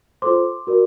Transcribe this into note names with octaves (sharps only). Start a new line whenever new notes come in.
F4 A4 C5 C6 D6
F#4 A#4 D5